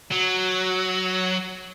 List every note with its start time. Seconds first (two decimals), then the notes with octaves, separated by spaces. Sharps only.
0.11 F#3